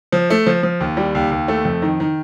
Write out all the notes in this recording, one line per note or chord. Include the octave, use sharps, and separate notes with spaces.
F3
A3
F3
F3
D#2
G3
D#2
D#2
A3
F2
D#3
D#3